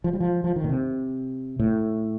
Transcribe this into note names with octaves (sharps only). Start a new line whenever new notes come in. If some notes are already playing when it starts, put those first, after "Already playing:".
F3
G3
F3
F3
D#3
A#2
C3
A2